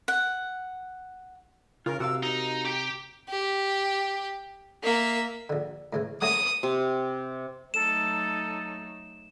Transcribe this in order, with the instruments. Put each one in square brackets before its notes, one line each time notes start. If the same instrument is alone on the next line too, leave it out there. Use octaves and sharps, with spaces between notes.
[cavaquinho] F#5
[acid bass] C#3 [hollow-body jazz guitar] F4 [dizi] A#4
[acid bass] C3 [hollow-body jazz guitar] F#4 A#4 F5 [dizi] E6
[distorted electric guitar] D#4 [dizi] A#5
[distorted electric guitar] G4 G5
[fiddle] G4
A#3 E5
[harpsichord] A#1 D3
A2 C#3 E3
[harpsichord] F#3 A3 F#4 [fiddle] D#6
[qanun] C3
[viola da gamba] F#3 A3 D#4 [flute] A4 [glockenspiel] E7